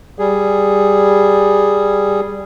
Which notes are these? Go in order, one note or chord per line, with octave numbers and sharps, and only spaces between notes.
G3 G#4